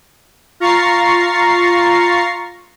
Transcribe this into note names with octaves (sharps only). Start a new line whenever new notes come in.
F4 A#5 C#6 A6 C7